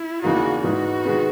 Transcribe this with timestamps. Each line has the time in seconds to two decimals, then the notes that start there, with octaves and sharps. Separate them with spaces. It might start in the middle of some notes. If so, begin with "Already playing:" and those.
Already playing: E4
0.22 E2 C#3 E3 A#3 D#4 F#4
0.63 G#2 E3 B3 D#4 F#4
1.05 D#3 G#3 B3